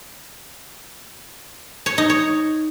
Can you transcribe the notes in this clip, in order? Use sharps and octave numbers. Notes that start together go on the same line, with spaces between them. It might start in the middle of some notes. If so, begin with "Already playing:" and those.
C#5
D#4
C#5